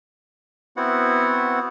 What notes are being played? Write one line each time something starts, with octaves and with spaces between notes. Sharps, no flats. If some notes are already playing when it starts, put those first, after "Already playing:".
B3 C4 E4 F#4 F#5